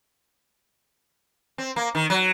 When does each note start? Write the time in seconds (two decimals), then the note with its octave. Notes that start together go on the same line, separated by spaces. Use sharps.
1.58 C4
1.76 A#3
1.95 D#3
2.10 F#3